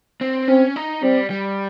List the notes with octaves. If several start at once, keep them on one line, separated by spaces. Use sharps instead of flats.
C4
C4 C#4
D#4
G3 C4
G3